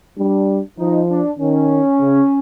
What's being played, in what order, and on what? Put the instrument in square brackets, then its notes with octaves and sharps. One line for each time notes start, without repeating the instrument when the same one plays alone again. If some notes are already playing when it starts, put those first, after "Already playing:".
[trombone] G3 [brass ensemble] D4
[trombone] F3 [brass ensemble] D#4
[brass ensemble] D4
[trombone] D#3 [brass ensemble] C#4
[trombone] C#3